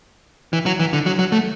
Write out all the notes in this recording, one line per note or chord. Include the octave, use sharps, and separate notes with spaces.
E3
F#3
E3
D3
F#3
F#3
A3